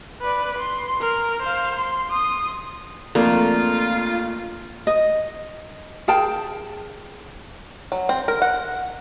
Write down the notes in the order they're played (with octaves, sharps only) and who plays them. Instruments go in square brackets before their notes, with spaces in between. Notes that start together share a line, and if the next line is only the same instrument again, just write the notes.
[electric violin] B4 D5
C6
A#4
C5 F5
C6
C6 D#6
[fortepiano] F2 A3 D4 [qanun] A#3 [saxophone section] F4
[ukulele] D#5
G#4 A#4 G5 A5
[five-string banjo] F#3
C4
A#4
F#5